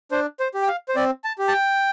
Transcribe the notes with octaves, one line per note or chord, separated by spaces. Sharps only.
D4 C5
C5
G4
G5
F5
C5
C4 D5
A5
G4
A5
G5